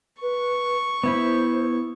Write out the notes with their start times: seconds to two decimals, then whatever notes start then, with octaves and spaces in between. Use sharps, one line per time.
0.22 B4 C#6
1.04 B3 E4 C5 B5